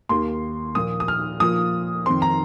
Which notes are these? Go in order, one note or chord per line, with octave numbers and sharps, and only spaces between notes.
D#2 D#3 A#3 C6
A#2 F3 A#3 D#6
D#6
F6
A#2 F3 A#3 D#6
F2 D#3 C4 C6
A#5